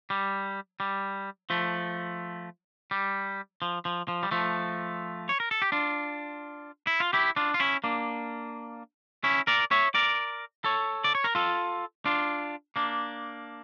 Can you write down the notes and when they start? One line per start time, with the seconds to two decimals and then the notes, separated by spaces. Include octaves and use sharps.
0.10 G3
0.80 G3
1.50 F3 A3
2.91 G3
3.62 F3
3.85 F3
4.08 F3
4.23 G3
4.31 F3 A3
5.29 C#5
5.40 A#4
5.51 A4
5.62 G4
5.72 D4 F4
6.87 E4
7.00 F4
7.13 E4 G4
7.36 D4 F4
7.54 F4
7.60 C#4 E4
7.84 A#3 D4
9.24 C#4 E4
9.47 A#4 D5
9.71 C#5 E5
9.95 A#4 D5
10.64 A4 C#5
11.04 D5
11.15 C#5
11.24 A#4
11.35 F4 A4
12.06 D4 F4
12.76 A#3 D4